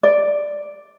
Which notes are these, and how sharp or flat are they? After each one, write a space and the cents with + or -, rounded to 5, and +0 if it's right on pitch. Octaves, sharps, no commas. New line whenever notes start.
D5 +0